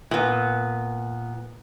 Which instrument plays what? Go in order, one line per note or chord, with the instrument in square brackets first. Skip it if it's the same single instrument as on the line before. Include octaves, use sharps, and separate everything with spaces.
[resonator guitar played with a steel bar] A#2 B3